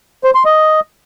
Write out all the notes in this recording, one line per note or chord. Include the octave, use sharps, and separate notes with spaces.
C5
C6
D#5